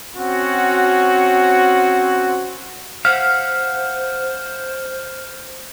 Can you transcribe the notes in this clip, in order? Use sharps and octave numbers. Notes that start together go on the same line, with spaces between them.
C4 C#4 F#4
C5 F5 F#5 F6